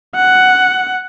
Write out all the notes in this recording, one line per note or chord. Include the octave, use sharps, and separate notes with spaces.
F#5